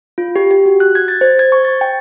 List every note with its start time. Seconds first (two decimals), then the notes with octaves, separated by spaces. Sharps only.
0.18 F4
0.36 G4
0.51 G4
0.66 F#4
0.80 F#6
0.95 G#6
1.08 A6
1.21 C5
1.39 G#6
1.52 C#6
1.65 A6
1.81 G5